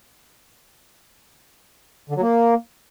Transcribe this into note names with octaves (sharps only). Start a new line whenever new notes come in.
D3
F#3
A#3